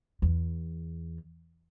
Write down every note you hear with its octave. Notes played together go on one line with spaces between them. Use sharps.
E2